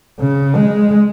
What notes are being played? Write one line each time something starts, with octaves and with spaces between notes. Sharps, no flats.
C#3
G#3